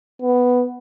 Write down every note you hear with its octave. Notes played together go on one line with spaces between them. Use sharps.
B3